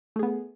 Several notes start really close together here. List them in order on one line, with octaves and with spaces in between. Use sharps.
A3 G#4 B3